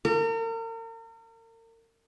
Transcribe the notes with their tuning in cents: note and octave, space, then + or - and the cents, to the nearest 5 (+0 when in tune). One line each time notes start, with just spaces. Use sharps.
A#4 -40